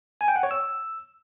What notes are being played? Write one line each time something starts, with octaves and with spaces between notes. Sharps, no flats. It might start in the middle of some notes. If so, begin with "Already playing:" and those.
G#5
G5
F#5
C#5
E6